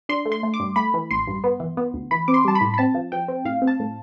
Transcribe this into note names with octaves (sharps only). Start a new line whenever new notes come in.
D4 C6
A3
C6
A3
D6
G2
A3 B5
E3
A1 C6
G2
B3
E3
B3
D2
E3 B5
C4 D6
C6
G3 A5
B5
A2
B5
C4 A5
F3
F3 G5
C4
A2 F5
C4
A5
A2